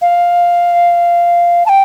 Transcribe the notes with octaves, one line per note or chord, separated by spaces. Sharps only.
F5
A5
G5